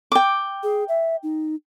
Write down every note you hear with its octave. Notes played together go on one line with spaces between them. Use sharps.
G5 D6
G#4
E5
D#4